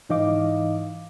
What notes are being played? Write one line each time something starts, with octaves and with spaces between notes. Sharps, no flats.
G#2 E3 D#4 D#5 F5 D6